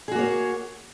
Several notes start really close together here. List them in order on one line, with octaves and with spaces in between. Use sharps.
G#4 F#4 A#3 C#5